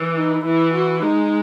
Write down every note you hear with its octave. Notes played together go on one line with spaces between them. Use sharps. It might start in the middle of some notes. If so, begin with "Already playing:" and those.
Already playing: E3
D#4
E3 E4
F#4
G#3 D#4